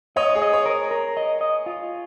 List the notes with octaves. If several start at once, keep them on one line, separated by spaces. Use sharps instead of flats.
C#5 D#5
G#4
D#5
C#5
A#4
A#4
D#5
D#5
F4